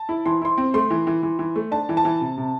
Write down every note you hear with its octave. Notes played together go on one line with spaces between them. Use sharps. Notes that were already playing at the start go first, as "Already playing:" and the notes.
Already playing: A5
E4
E3 C6
E4 C6
C4
A3 C6
E3
E3
E3
E3
A3
D4 A5
E3
A5
E3
C3
C3